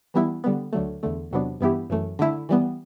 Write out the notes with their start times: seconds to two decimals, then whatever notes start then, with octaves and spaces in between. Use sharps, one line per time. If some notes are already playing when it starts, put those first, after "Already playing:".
0.14 E3 G3 B3 E4
0.44 D3 G3 B3
0.73 D2 D3 F#3 A3
1.03 E2 D3 A3
1.31 E2 C3 F#3 B3 D4
1.61 G2 E3 B3 E4 G4
1.90 F#2 E3 A3
2.19 D3 A3 E4
2.49 E3 G3 B3